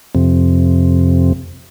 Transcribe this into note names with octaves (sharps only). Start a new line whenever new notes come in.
F2 C3